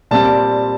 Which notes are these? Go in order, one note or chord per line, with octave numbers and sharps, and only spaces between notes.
A#2 G3 C4 A5